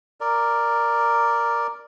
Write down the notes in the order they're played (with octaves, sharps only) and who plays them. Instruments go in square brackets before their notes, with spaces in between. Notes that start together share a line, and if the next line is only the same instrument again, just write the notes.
[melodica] A#4 D5